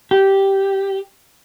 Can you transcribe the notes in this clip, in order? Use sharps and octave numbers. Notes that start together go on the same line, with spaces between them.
G4